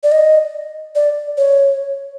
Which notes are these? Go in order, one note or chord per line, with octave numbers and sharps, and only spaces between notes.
D5
D#5
D5
C#5